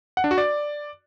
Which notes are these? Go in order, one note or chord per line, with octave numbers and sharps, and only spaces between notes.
F#5
D4
F#4
D5